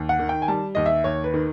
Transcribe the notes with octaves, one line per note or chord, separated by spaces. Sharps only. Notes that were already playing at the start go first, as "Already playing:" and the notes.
Already playing: D#2
F#5
D#3
G5
G#5
G3 A5
D#2 D#5
E5
D#2 C#5
B4
D#3